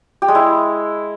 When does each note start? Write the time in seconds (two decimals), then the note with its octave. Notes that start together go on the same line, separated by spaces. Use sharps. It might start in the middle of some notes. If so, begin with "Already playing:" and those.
0.22 G4
0.28 G#3
0.35 E4